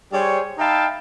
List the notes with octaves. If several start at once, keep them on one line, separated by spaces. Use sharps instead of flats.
G3 G#4 C5 C#5
D#4 E5 F5 G5 A5 B5